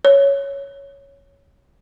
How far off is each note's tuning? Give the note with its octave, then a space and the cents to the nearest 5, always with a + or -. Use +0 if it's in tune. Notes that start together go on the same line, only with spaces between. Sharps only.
C#5 +5